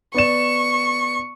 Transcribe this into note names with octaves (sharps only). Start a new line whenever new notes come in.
B3 D5 C#6 E7